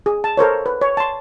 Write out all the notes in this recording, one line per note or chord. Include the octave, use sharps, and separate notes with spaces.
G#4
A5
A4 A#4 C5 C#5
B4
C#5
A5 C6